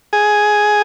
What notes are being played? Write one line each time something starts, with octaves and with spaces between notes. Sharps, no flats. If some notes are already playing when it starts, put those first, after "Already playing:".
G#4